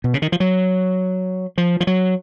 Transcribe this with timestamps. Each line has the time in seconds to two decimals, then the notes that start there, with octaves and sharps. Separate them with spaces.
0.04 B2
0.14 C#3
0.22 D#3
0.32 F3
0.40 F#3
1.58 F3
1.80 F3
1.87 F#3